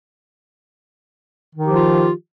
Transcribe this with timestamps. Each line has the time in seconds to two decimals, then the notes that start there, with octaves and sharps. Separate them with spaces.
1.53 D#3
1.58 D#4
1.63 G4
1.67 F3
1.72 F4